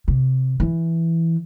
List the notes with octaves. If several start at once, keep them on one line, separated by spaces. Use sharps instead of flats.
C3
E3